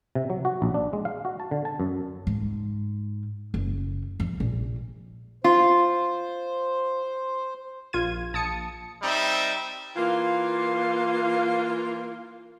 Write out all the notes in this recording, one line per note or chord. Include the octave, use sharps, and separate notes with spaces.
C3
F#3
F#4
A#1
D4
G#3
F5
F#4
A5
D3
A5
F#2
G#2
F#1
F2
A#1
F4 C5
A#1 F4 G#6 D#7
A#1 A5 D#6 C#7
G3 C4 D#4 E5
E3 A#3 F4